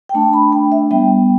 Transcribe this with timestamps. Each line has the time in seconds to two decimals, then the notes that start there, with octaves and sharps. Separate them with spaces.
0.09 G5
0.14 A3 D4 A5
0.33 B5
0.52 G5
0.72 E5
0.91 G3 B3 G5